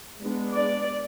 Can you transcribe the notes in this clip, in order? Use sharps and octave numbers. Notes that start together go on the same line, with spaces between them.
G#3 B3 D4
D5